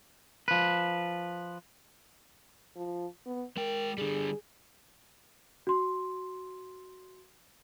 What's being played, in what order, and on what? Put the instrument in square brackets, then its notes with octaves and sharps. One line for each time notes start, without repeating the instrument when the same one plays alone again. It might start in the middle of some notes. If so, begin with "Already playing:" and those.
[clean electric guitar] F3 B4
[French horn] F3
B3
[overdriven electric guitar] G#3 G5 [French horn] A#4
[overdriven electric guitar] D3 G3 [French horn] G#4
[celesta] F#4 C6